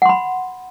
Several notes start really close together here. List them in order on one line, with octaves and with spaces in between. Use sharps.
F#5 C6 B5